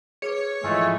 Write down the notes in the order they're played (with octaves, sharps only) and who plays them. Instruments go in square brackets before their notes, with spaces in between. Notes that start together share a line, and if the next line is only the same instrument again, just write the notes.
[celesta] G#4 B4 D6 [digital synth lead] C#5
[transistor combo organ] G#2 E3 F3 [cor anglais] A3 [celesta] D#5 E5 G#5